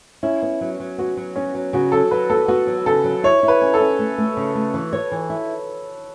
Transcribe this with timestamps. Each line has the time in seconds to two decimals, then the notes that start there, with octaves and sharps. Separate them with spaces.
0.23 C#4 E4
0.42 B3
0.61 F#3
0.80 F#3
0.98 B3 F#4
1.17 F#3
1.36 B3 C#4
1.55 F#3
1.73 C#3 F#4
1.92 F#3 A4
2.11 F#3 B4
2.30 B3 A4
2.48 B3 F#4
2.67 F#3
2.86 C#3 A4
3.04 F#3
3.23 E4 C#5
3.43 E4
3.48 B4
3.62 C#4
3.74 A4
3.80 C#4
3.99 A3
4.18 A3
4.37 C#3
4.55 A3
4.74 E3
4.93 C#5
5.12 E3
5.30 E4